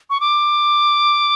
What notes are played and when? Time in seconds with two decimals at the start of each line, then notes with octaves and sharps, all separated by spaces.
0.10 C#6
0.20 D6